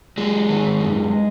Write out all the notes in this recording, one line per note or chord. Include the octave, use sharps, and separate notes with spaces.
F#3 G#3
D#3
F#2